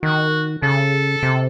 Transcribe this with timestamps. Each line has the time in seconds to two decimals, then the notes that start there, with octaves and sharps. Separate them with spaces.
0.03 D#3 F#4
0.62 C#3 A4
1.23 C3